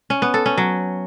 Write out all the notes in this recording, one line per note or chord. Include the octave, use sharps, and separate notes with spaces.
C#4
B3
A4
C#4
F#3